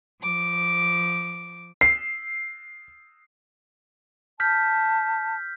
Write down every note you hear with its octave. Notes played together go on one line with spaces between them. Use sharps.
F3 D6
C7
A5 F6 G6 B6